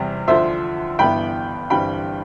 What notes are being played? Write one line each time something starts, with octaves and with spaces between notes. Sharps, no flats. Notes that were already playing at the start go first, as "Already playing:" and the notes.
Already playing: E2 C3 G3 C4
D2 D3 F3 C5 E5
G1 G2 E3 B3 E4 G5 B5
G1 G2 E3 G3 C4 G5 B5